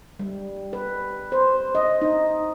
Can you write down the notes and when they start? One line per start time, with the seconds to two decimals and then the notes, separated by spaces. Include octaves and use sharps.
0.20 G3
0.73 B4
1.32 C5
1.75 D#5
2.02 D#4